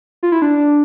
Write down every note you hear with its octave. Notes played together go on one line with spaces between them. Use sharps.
F4
E4
D4